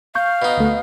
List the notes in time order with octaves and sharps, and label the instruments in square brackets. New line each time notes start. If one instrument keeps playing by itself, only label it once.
[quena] F5 [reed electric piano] C#6 G6
[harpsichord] B2 D#4
[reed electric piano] D2 A3